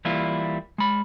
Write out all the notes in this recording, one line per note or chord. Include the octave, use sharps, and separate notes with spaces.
E3 G3 A#3 E4 F4
G#3 B5